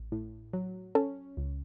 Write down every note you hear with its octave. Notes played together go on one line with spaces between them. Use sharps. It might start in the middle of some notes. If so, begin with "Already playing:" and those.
Already playing: A1
A2
F#3
C#4 A4
C#2